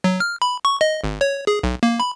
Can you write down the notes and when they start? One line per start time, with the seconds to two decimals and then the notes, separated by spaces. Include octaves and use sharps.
0.04 F#3
0.20 F6
0.42 B5
0.65 C#6
0.81 D#5
1.04 G#1
1.21 C#5
1.47 G#4
1.63 B1
1.83 A#3
2.00 B5